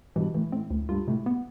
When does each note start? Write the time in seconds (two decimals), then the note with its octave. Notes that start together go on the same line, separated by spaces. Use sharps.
0.16 G2 B2 E3
0.35 A2 E3
0.52 A2 C4
0.70 D2 A2
0.89 G2 F4
1.08 A2 C3
1.26 B3